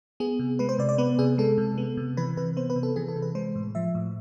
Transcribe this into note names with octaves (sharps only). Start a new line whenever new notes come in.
B3 G#4
C3
G#3 B4
C5
C3 D5
D5
B3 B4
C3 G#4
G#3 A4
C3
B3
C3
E3 B4
C3 B4
B3 C5
B4
C3
A4
E3 G#4
A4
C3
B4
G#3 C5
A2
F3 E5
A2